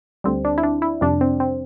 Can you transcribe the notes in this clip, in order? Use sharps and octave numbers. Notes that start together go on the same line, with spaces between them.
D2 D3 G3 C4
D4
E4
D4
E4
F2 C3 G3 D4
C4
C4